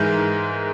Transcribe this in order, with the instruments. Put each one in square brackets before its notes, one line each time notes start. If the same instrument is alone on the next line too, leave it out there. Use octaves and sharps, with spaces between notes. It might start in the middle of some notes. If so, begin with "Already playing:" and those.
Already playing: [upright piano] G#2 E3 G#3 A#4